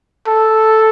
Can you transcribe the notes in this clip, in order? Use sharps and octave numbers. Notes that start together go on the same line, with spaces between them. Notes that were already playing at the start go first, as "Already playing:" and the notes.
A4